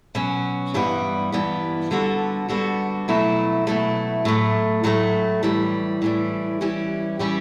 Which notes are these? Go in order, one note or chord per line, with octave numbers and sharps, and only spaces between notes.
B2 F#3 C#4
G2 E3 G3 B3
G2 E3 G3 B3
D3 G3 B3 F#4 A4
D3 G3 B3 F#4 A4
B2 F#3 A3 E4
B2 F#3 A3 E4
A2 F#3 A3
A2 F#3 A3
A2 E3 G3
A2 E3 G3
E3 G3 C#4 G4
E3 G3 C#4 G4